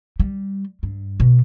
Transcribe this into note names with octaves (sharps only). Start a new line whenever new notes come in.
G3
G2
B2